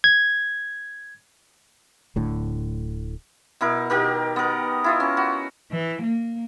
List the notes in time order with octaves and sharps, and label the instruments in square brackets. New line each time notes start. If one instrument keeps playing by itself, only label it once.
[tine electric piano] G#6
[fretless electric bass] D1 A2 D3
[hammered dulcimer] B2 E4 A#4
B2 D#3 G4 A#4
B3 A#4
E4 F4 D#5
C#4
F#4
[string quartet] E3
A#3